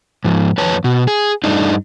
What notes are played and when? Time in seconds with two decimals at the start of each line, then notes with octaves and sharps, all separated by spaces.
0.25 G#2 F3
0.58 F2 B4 C#5 A5
0.84 B2
1.08 G#4
1.44 G2 A3 D4 D#4